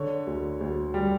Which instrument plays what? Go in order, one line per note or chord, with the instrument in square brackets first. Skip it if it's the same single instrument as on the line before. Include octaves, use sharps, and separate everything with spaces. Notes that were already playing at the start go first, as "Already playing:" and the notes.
Already playing: [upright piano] D3 C#5
D2
D2
G3